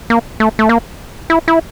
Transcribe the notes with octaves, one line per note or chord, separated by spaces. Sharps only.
A#3
A3
A3
A#3
E4
E4